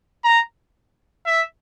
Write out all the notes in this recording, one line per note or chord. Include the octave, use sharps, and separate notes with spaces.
A#5
E5